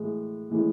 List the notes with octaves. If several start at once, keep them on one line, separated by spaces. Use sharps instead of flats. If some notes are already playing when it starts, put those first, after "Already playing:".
Already playing: A2 E3 G#3
A2 E3 G#3